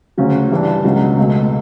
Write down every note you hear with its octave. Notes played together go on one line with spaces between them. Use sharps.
D2 C#3 F#3 C#4
G2 E3 G3 D4
C#2 B2 F#3 C#4
C#2 B2 A3